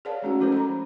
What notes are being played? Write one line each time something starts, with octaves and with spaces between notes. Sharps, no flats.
G#4 A#4 C#5 D5 F5 A5
G#3 A3 C#4 D#4 F#4 G#4
F3 C#4 E4 A4 A#4 C5
A#5 B5